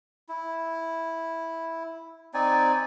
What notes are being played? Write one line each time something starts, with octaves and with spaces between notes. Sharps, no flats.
E4
C4 D#4 D5 G#5